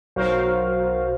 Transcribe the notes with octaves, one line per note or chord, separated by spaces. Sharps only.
B1 F#3 F#4 A#4 C5 F5